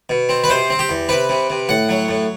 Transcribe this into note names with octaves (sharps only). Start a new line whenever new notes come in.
B2
C4
B4
C3 C5
C4
G4
E2
C3 B4
C3
C3
A2 F#5
F#3
A2